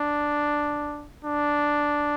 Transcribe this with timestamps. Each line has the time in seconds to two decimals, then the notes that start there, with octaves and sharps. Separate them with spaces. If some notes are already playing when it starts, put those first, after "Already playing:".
Already playing: D4
1.25 D4